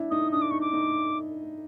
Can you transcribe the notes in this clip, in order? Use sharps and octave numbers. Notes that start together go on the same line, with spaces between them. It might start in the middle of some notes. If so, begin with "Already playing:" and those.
Already playing: D4 E4
D#4 D#6
D4 D#6
D6
D#4 C#6
D6
D#4